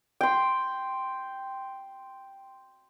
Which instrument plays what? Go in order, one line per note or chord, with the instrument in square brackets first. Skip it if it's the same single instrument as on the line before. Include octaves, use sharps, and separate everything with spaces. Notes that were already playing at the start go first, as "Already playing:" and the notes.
[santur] G5 C6